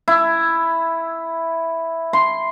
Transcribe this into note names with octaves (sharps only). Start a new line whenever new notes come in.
E4
C6